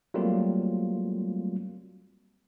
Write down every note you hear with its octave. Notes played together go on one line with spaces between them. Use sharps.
F#3 G3 A3 A#3 C4 F4